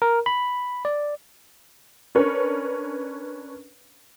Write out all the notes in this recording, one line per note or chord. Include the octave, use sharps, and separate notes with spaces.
A#4
B5
D5
C#4 D4 A#4 B4 C#5